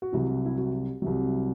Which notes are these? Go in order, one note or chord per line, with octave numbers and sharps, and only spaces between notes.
F#4
C2 C3 F#3 E4
E4
F#4
C2 C3 F#3